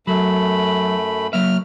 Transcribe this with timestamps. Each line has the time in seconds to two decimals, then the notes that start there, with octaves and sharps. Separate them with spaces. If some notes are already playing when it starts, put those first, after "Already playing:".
0.07 F#2 F#3 A3 B5
1.33 F#3 A#3 E5 F6